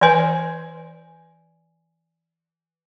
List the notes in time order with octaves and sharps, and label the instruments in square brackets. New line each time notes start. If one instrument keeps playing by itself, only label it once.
[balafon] E3 B4 [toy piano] D5 G#5 C6